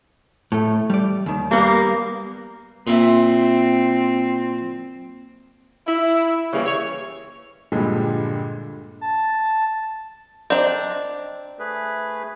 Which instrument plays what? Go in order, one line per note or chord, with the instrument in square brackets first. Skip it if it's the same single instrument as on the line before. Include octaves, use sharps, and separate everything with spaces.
[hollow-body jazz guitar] A2 A3
G3 D5
D#2 D#3
[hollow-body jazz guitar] G3 B3 [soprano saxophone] A#3
[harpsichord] A#2 E4 [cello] C4
[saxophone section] E4
C#3 E3 G3 A#3
C#5
[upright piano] G2 A#2 D3 F3 G3 G#3
[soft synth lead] A5
[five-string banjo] C4 D4 [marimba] C5 D#5 A#5 [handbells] D5
[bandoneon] A3 G#4 B4